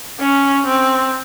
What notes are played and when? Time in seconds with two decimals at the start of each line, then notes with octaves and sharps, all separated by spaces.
0.20 C#4
0.67 C4